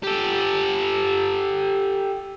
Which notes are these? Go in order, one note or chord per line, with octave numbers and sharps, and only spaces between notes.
G4 A4